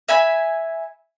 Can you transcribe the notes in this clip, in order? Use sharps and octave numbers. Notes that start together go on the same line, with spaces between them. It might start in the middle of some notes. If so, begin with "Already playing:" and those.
E5 G#5 B5